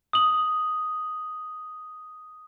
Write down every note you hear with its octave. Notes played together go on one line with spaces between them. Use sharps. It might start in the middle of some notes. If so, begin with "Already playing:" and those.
D#6 F#7